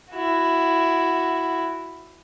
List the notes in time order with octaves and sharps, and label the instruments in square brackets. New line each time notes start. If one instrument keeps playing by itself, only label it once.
[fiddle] E4 F#4